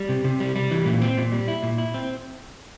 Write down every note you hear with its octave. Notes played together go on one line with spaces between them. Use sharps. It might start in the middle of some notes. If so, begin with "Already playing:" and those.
Already playing: G3
C3
C3
G3
G3
E3
A#2
C4
A#2
G3
E4
A#2
E4
C4